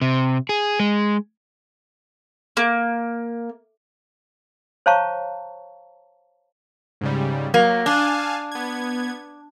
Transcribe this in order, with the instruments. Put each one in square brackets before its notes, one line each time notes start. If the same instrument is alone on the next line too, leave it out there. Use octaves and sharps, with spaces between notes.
[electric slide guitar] C3
G#4
G#3
[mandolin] A#3
[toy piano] C5 C#5 F5 A5 A#5 C#6
[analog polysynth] G#2 C#3 G3
[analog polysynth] F#3 [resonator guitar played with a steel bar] A#3
[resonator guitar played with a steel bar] D4 [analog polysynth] F5 G#5 A5
[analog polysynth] B3 G#6